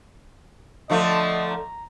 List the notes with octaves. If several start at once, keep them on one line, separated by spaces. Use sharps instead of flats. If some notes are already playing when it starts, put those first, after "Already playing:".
D3 F3 A3 D#5
A#5